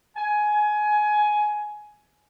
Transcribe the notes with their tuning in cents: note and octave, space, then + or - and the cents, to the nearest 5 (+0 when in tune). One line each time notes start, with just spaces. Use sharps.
G#5 +15